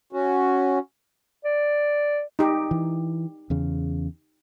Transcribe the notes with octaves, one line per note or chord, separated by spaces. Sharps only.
C#4 F#4
D5
D#4 G4
E3
E2 C#3